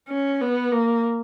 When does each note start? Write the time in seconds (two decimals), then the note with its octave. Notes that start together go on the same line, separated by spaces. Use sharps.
0.08 C#4
0.41 B3
0.72 A#3